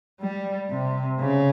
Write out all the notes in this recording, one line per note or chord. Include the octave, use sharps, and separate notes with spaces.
G3
C3
C#3